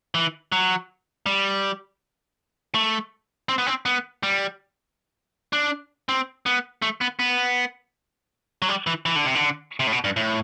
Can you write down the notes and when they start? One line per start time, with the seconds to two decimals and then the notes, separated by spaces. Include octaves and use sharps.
0.14 E3
0.52 F#3
1.26 G3
2.75 A3
3.49 C4
3.58 B3
3.67 C4
3.85 B3
4.23 G3
5.53 D4
6.09 C4
6.46 B3
6.82 A3
7.01 B3
7.19 B3
8.62 F#3
8.69 G3
8.87 E3
9.06 E3
9.16 D3
9.25 C3
9.35 D3
9.80 C3
9.87 A2
9.92 B2
10.04 G2
10.16 A2